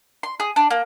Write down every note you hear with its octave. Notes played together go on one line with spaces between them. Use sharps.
C6
G#4
D4
A#3